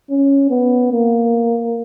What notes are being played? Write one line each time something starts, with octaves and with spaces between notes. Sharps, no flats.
C#4
B3
A#3